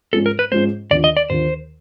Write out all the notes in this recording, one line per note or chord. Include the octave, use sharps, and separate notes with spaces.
G#2 F3 G#3 C#4 F4 A4
A#4
B4
G#2 F3 G#3 C#4 F4 C5
D#2 D3 F3 D5
D#5
D5
D#2 D3 F3 C5